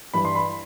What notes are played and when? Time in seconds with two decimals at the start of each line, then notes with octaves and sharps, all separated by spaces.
0.14 G2 E3 G3 B5
0.25 C6
0.35 B5